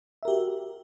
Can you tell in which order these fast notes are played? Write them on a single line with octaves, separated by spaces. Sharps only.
E5 A#4 G4 F#4